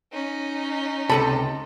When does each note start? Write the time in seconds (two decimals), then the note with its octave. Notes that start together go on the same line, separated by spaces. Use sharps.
0.12 C#4 D#4
1.10 C#2 C3 A4 A5 B5